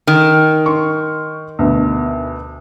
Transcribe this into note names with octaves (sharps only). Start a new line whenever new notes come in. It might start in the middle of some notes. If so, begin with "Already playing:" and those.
D#3
C6 C#6
D2 B2